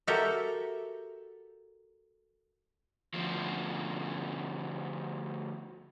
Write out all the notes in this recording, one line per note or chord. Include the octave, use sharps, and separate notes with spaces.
F#4 G4 A4 A#4 E5
D2 F3